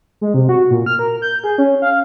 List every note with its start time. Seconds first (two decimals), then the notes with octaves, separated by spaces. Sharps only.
0.21 G#3
0.34 C3
0.49 F#4
0.71 A#2
0.86 F6
0.99 A#4
1.22 G6
1.44 G#4
1.58 C#4
1.82 F5